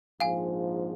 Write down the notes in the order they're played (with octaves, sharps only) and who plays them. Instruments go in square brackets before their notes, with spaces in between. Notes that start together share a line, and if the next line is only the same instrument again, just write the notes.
[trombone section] A#1 G#2 F3 [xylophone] F5 G#5